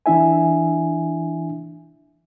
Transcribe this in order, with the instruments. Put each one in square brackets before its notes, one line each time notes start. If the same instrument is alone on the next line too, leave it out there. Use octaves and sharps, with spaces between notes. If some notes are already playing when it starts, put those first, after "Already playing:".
[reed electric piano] E3 D4 E4 E5 G#5